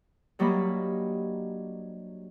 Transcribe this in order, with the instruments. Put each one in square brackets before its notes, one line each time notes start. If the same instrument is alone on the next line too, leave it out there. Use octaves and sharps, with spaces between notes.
[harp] G2 F#3 G3 A#3 D#5 B5